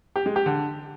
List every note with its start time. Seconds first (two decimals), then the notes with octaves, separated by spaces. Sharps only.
0.16 G4
0.26 G#3
0.36 G4
0.46 D3